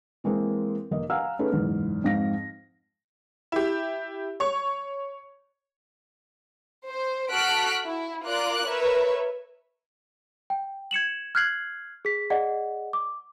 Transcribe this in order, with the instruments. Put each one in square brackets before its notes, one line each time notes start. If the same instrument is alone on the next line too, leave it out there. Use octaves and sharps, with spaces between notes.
[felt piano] E3 G#3 A#3 C4 C5
F1 A#3 D#5
F5 F#5 G#5 A#5 E6 F6
A3 C#4 D#4 G#4 A4 B4
F#1 E2 G#2
F2 G#2 C4 F5 A#6
[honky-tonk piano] E4 G4
C#5 C#6
[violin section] C5
F#4 A4 F6 F#6 B6 D7
E4
F4 A#4 D5 D6 F#6
A#4 B4 C#5 E5
[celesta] G5
G#6 C#7 E7 F#7
F6 F#6 G#6 C7 F#7
G#4 B6
G#4 D5 D#5 F#5
D6